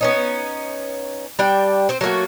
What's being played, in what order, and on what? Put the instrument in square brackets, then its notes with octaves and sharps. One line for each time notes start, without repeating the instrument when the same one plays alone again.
[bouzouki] B3 C#4 D#4
G3 D4 G5
C4 C5
F#3 A3 A#3 F#4